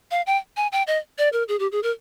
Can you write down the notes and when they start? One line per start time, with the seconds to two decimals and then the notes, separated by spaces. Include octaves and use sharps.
0.11 F5
0.27 G5
0.57 G#5
0.72 G5
0.87 D#5
1.18 D5
1.33 A#4
1.48 G#4
1.59 G4
1.72 G#4
1.83 A#4